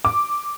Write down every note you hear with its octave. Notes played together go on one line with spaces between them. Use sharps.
D6